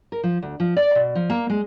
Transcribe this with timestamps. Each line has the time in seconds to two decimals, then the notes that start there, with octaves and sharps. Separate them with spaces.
0.12 A#4
0.23 F3
0.42 D2
0.60 F3
0.77 D5
0.95 B2
1.15 F3
1.30 A#3
1.50 G#3